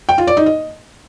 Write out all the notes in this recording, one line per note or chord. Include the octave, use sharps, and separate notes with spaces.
G5
F4
D5
D#4
D#5